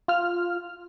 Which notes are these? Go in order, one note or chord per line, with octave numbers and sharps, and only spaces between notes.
F4 F6